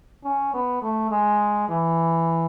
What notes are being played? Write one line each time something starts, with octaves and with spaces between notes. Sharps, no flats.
C#4
B3
A3
G#3
E3